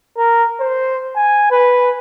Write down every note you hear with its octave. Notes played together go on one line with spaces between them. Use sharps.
A#4
C5
G#5
B4